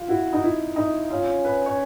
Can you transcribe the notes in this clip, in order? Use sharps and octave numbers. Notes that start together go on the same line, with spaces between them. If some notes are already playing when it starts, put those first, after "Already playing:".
Already playing: F4
E4 F#4
D#4
E4
D#4 E4
C#4 F4
B4
C#5